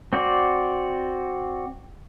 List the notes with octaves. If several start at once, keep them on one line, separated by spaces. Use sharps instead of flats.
C4 F#4 D5